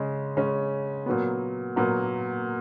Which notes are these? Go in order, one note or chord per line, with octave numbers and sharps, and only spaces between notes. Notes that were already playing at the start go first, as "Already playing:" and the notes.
Already playing: C#3 G#3 C#4
C#3 G#3 C#4
A#2 F#3 B3
A#2 F#3 B3